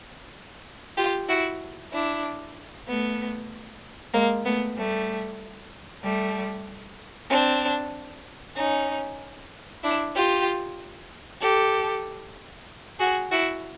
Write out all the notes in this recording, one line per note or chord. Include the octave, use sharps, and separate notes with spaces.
F4 G4
E4 F#4
D4 E4
A3 B3
G#3 A#3
A3 B3
G3 A3
G3 A3
C4 D4
C#4 D#4
D4 E4
F4 G4
G4 A4
F#4 G#4
E4 F#4